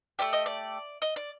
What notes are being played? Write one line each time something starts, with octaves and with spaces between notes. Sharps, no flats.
A3 D4 G4 D5
D#5
D5
D#5
D5